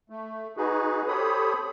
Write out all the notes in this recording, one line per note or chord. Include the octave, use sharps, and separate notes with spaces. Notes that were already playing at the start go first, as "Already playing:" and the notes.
A3
D#4 F#4 G#4 B4
G4 A4 C5 C#5 B5 D#6